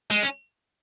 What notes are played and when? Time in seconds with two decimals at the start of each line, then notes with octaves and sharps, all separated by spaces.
0.11 G#3
0.23 C#4